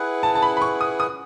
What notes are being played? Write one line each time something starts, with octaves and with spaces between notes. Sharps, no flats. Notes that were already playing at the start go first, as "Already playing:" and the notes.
Already playing: E4 G#4 B4 F#5
A5
A5
B5
B5
C#6
D#6
D#6